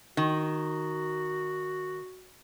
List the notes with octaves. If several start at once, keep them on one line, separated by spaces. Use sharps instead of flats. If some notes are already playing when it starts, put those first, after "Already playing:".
D#3 F#4